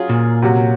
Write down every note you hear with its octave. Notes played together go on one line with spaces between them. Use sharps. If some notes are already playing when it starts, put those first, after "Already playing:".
Already playing: F#3 C#4 F4 G#4
A#2
C3 F#3 C#4 F#4